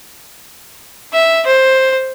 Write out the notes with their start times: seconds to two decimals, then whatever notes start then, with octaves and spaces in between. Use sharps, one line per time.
1.13 E5
1.46 C5